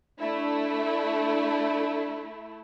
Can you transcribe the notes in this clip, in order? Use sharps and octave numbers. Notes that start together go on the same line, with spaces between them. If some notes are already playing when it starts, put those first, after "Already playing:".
A3 D4 E4